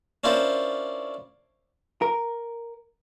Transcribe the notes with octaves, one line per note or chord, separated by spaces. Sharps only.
C#4 D4 E4 F4 A#4 C5
A#4